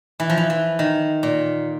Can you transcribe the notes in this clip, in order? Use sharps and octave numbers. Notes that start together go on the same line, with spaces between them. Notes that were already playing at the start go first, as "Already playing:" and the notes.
E3
F3
E3
E3
D#3
A#2